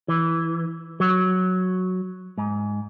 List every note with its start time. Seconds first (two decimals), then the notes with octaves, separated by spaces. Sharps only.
0.08 E3
1.00 F#3
2.38 G#2